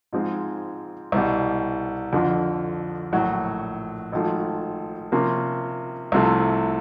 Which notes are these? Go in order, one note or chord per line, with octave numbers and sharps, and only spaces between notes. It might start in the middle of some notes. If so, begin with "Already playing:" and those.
G#2 F3 G#3 C4
C2 B2 G3
F2 D3 F3
A#1 A2 F#3
G#1 G#2 F3 A3
C3 F3 A#3 C#4
C2 C3 F3 A3